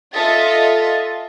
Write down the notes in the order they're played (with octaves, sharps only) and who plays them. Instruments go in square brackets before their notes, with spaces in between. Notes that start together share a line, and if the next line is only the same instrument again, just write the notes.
[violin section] F4 A4 D#5 E5 A6